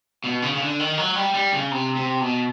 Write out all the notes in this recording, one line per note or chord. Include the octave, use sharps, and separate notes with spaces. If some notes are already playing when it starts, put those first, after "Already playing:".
B2
C#3
C#3
D3
D#3
F#3
G3
G3
C#3
C3
C3
B2